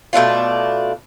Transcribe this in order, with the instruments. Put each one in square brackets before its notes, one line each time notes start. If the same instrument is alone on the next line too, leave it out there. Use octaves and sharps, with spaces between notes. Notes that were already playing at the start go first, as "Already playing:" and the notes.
[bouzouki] B2 A3 D4 F4